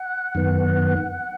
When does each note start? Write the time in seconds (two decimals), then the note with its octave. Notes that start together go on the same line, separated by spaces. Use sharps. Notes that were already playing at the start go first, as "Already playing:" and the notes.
Already playing: F#5
0.35 F#2 D#3 B3